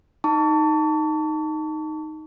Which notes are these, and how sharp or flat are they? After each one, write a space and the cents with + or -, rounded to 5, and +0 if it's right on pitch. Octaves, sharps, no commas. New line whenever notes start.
D#4 +0 A5 +20 C#6 +40